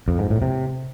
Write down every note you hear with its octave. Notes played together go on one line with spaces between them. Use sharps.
F2
G#2
A2
C3